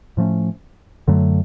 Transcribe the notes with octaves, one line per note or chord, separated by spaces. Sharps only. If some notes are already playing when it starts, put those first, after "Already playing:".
A2 F3 A3 C#4
F#2 D3 F#3 A3